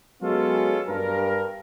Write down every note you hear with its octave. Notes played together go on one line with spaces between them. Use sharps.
F#3 G#3 B3 C#4 F4 A4
G2 A#4